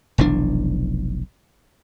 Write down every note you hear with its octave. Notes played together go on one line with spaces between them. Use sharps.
F1 B1 E3 D4